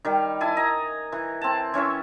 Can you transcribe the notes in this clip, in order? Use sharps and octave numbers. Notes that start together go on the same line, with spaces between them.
D#3 G3
E4 G#5 A5
D#5 A#5
E3
C4 A5
E3 C#4 C#5 E5